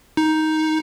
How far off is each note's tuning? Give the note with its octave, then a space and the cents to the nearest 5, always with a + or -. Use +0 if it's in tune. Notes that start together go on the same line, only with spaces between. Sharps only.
D#4 +10